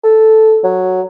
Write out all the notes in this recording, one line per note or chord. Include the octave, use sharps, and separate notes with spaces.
A4
F#3